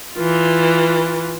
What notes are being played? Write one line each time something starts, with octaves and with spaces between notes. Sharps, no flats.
E3 F4